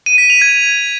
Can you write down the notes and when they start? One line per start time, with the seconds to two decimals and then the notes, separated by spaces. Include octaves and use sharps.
0.06 D#7
0.18 B6
0.30 F7
0.41 G#6